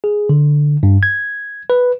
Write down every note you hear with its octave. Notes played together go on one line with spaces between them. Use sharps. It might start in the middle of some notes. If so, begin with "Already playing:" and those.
G#4
D3
G2
G#6
B4